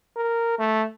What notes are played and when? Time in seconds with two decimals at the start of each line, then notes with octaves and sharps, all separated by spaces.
0.16 A#4
0.59 A3